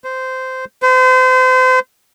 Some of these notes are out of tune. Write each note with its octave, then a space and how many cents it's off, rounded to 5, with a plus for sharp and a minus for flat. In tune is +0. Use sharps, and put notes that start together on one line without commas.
C5 -15
C5 -35